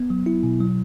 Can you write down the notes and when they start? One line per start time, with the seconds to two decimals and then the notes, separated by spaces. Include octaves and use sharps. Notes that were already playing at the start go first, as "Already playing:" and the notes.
Already playing: B3
0.10 F#3
0.26 E4
0.43 B2
0.60 F#3